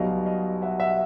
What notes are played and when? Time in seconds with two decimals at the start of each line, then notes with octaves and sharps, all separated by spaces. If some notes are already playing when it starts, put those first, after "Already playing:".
Already playing: B1 B2 G3 D#5 F5
0.26 D#5 F5
0.62 E5 F#5
0.80 E5 F#5